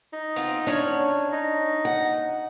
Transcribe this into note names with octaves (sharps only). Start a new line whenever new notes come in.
D#4
B3 C4 F4
C#4 D4 C#5
D#4
F#5